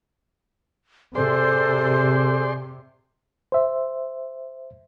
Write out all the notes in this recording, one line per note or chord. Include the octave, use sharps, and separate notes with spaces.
C3 G#4 A4 C5 D5 C6
C5 E5